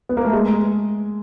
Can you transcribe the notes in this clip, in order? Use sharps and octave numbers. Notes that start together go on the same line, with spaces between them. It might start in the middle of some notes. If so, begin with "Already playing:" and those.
B3
A#3
A3
G#3